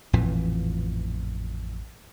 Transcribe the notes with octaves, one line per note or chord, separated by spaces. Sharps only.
A1 F2 A#2 E3